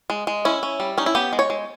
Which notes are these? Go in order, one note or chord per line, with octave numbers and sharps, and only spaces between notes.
G#3
G#3
C#4 E4
C#4
G3
C#4 D#4
E4
B3 G4
G#3
C#5
G#3